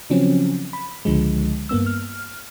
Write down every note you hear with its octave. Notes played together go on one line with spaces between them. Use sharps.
C#3 F3 F#3 C4 C#4
B5
C#2 D3 F3 G#3
G2 A#3 B3 E6
F6